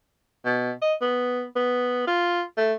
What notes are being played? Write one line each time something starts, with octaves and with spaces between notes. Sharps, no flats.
B2
D#5
B3
B3
F4
A3